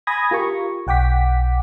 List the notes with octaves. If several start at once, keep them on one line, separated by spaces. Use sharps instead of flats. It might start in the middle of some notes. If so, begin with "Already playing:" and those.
G#5 B5 D#6 G#6 A#6
F4 G4 A#4 C#6
B1 F#5 G5 D6 B6